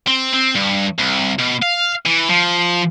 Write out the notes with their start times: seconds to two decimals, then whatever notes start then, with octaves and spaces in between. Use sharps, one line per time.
0.08 C4
0.34 C4
0.56 G2
0.99 C2
1.39 B2
1.62 F5
2.06 E3
2.30 F3